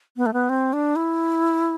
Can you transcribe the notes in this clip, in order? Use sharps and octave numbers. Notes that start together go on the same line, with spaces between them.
B3
A3
B3
C4
D4
E4